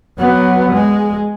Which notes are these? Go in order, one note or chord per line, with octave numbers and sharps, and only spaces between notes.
F#3 B3
G#3